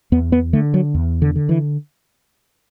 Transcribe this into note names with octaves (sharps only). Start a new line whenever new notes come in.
E2 B3
B3
D3 A3
F#3
E2
D3
D3
E3